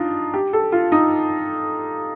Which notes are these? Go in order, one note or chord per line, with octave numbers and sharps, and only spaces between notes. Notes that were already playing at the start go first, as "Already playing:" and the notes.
Already playing: D4 D#4 F4
G4
A4
F4
D#4